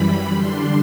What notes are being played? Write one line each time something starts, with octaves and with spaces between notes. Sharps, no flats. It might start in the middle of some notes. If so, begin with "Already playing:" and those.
Already playing: F#2 E3 G3 B5
D3 G3 D4 C6